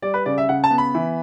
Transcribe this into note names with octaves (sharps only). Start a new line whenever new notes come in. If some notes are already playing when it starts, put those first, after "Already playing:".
G3 D5
B4
C#3 D5
E5
C#3 F#5
A5
B3
B5
E3